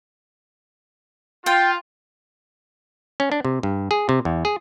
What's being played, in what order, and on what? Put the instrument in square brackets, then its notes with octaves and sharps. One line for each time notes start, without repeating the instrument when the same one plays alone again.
[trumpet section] F4 [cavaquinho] G5
[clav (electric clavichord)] C#4
D4
C3
G2
G#4
C3
E2
G#4